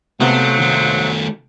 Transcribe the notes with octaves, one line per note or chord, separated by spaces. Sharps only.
G#2 C3 F3 F#3 A3 B3
D#3 A3